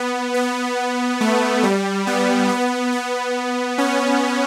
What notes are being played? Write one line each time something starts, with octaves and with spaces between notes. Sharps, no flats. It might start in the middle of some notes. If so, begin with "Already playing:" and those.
Already playing: B3
B3
A3
G3
B3
B3
B3
C#4